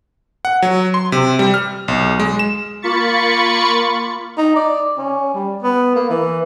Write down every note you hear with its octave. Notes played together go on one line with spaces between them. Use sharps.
F#5
F#3
C6
C3
G3
F6
B1
G#3
E7
A#3 F4 B5 C#6 A6 C#7
D#4
D5
C#4
G3
B3
A#3
E3